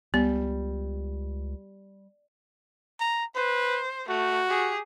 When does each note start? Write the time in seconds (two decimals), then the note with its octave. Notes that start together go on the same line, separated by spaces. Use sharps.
0.14 C#2 G3 B3
3.00 A#5
3.35 B4 C5
4.09 A3 F#4
4.48 G4 G#4